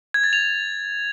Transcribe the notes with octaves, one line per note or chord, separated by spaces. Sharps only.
G#6
A6
F7